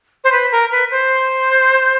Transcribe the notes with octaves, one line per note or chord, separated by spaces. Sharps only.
C5
B4
A#4
B4
C5